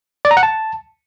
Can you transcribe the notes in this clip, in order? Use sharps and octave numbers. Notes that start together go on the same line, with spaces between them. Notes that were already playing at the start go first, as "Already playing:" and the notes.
D5
A#5
F#5
A5